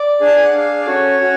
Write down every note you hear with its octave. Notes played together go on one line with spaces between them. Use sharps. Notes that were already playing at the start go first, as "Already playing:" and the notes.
Already playing: D5
D4 G#4
A5
G#5
F#5
D4 G#4 F5
D5
C#4 F#4 A4 C#5
C#4 F#4